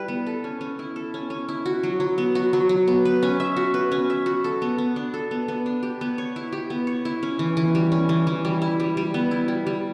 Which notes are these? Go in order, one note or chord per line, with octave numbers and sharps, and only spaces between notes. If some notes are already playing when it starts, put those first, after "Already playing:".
Already playing: G3 E4 B4
B3
A4
C#4
C#4
E4
A4
C#4
C#4
E4
F#4
F#3
F#3
B3
F#4
F#3
F#3
B3
B4
C#4
E5
F#4
B4
C#4
E5
F#4
A4
B3
B3
D4
A4
B3
B3
D4
G4
B3
C#5
E4
G4
B3
C#5
E4
C#4
E3
E3
G3
C#4
E3
E3
G3
E4
G3
G3
B3
E4
G3
G3